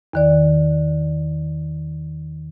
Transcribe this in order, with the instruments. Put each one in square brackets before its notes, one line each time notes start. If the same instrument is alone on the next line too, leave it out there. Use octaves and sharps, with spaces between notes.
[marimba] E2 D#3 D5